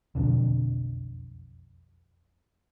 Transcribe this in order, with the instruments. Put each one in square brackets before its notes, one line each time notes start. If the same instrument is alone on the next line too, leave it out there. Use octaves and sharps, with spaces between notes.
[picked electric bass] E1 B1 F2 D3